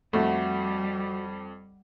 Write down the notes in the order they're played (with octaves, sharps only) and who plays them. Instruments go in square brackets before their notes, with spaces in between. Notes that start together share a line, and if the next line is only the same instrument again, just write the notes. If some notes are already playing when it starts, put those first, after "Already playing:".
[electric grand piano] F2 [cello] G3 [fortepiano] A3 [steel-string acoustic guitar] F#4